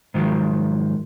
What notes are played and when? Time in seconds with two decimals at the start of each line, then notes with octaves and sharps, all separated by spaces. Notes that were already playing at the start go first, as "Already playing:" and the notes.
0.14 G#2 D#3 F3 F#3